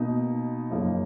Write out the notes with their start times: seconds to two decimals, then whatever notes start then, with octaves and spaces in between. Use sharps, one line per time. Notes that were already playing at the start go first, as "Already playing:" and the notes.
Already playing: B2 A#3 D#4
0.70 F#2 C#3 F3 A#3 D#4